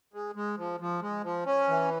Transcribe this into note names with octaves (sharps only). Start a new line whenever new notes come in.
G#3
G#3
F3
F3
G#3
F3
C#4
E3